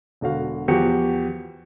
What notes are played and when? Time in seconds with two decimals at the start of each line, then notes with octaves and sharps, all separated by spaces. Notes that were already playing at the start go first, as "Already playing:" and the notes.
0.21 E1 D3 F#4 F5
0.68 E2 F3 F#4 G4 C#7